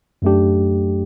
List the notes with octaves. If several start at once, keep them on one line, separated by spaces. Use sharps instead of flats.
F#2 F#3 A3 D4 G4